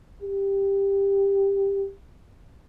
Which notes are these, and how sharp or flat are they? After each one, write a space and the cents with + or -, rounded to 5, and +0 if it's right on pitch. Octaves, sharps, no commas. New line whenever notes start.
G4 +10